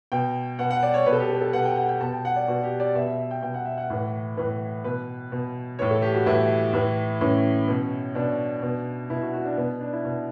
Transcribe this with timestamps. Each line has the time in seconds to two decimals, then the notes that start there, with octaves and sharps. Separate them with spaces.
0.12 B2 G5
0.59 B2 F#5
0.70 F#5
0.83 D5
0.94 C#5
1.06 B2 B4
1.13 A4
1.18 G4
1.29 A4
1.42 A4
1.53 B2 F#5
1.65 G5
1.77 F#5
1.89 G5
2.01 B2 A5
2.12 G5
2.25 F#5
2.36 D5
2.48 B2 F#4
2.63 G4
2.80 D5
2.95 B2 E5
3.06 E5
3.19 E5
3.31 G5
3.42 B2 G5
3.54 F#5
3.65 E5
3.78 F#5
3.90 A2 E3
4.37 A2 E3 B4
4.84 B2 B4
5.32 B2
5.79 A2 E3 C#5
5.91 A4
6.02 G4
6.14 F#4
6.26 A2 E3 E4
6.73 A2 E3
7.21 A2 E3 C#4
7.68 B2
8.15 B2 D4
8.62 B2
9.10 B2 E4
9.22 F#4
9.33 F#4
9.45 D4
9.57 B2 B3
9.81 D4
9.93 E4
10.05 B2